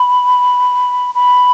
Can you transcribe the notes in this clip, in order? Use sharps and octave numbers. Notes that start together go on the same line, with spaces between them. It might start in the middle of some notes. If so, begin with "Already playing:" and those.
Already playing: B5
B5